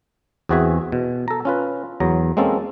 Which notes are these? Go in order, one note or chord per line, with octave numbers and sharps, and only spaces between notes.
E2 C4 F#4 G#4 E5 G#5
B2
A4 A#5
C#4 F4 B4
E2 F#3 A#5
G#3 A#3 C4 C#4 A4